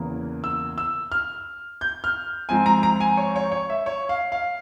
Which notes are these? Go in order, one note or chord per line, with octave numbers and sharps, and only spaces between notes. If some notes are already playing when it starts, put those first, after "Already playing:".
Already playing: E2 C#3 E3 A#3
E6
E6
F6
G6
F6
G#2 F3 C4 G#5
A#5
A#5
G#5
C#5
C#5
C#5
E5
C#5
F5
F5